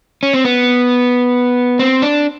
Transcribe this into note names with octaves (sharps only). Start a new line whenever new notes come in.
C#4
C4
B3
C4
D4